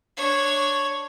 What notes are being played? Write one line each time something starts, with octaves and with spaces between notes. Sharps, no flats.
D4 C#5